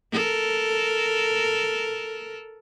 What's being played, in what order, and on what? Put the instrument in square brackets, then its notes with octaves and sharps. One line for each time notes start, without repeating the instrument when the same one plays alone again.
[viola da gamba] A4 A#4